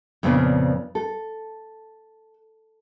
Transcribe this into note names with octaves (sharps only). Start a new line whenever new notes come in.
F2 A#2 C#3 B3 C#4 D4
A4